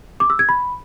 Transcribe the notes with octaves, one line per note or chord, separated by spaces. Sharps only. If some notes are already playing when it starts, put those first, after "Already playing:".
D6
E6
G#6
B5